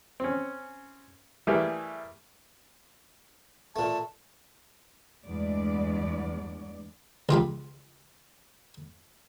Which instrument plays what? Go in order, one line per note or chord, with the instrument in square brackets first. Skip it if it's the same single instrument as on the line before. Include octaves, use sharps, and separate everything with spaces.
[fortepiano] C4 C#4
E3 G3 A3 A#3 G4 G#4
[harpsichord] A#2 A3 [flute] A5
[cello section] E2 G2 G#3 A3 D5
[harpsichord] C#2 F4 G4 B5